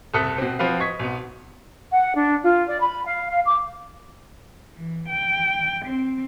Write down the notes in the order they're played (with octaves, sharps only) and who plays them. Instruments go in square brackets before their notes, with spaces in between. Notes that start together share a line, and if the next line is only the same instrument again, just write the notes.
[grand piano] F#1 C2 A4 D#6 F#6 B6
B2 C4
F3 C4 F#4 B4 F5
D#5 C#6 G#6 B6
B1 B3
[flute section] F#5
D4
F4
D5
B5
F5
F5
D6
[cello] E3
G5
C4